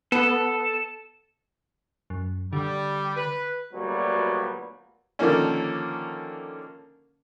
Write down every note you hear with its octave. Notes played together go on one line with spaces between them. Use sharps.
B3 A4
F#2
D3 G3
B4
D2 A#2 F#3 G3 B3
D3 D#3 F3 A#3 C#4